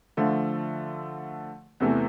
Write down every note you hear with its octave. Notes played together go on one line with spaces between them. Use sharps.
D3 F3 A3
E2 C3 E3 A3